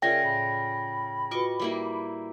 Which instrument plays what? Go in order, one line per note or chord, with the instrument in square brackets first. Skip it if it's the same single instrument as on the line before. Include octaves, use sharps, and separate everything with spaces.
[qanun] C#3 F4 G#5 [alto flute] A#4 [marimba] D5 E5 [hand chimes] G5 A#6
[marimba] A2 [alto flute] B5
[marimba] F4 F#4 B4 [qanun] D#5 C#6 D6
[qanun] G3 A#3 E4